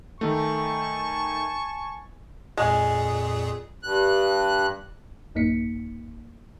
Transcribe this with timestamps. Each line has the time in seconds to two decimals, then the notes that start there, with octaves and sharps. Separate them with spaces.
0.21 D#3 A3 G#5 A5 C#6
2.57 F2 A#2 G#3 G#4
3.83 G2 F#6
5.35 A1 F#2 A#3 D#4 B6 C#7